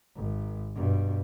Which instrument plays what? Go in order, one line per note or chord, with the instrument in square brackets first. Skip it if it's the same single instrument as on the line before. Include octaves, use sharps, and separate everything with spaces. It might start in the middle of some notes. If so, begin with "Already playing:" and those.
[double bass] G#1
G2 B2